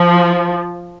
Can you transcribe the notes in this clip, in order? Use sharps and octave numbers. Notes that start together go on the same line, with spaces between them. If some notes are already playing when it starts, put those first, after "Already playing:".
Already playing: F3